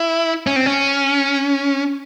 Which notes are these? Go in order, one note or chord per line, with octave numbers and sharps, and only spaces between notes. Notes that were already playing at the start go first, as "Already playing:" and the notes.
Already playing: E4
C#4
C4
C#4